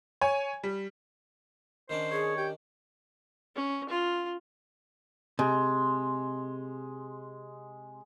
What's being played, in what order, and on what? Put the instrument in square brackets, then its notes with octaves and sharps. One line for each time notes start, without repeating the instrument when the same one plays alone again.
[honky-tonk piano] C#5 G#5
G3
[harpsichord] D#3 C#4 D4 [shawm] C5
[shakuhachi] G#4 [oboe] C#5
[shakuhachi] G4 [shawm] G5
[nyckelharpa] C#4
F4
[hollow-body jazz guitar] C3 [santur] G#3